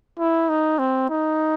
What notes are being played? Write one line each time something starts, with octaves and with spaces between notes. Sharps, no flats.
E4
D#4
C4
D#4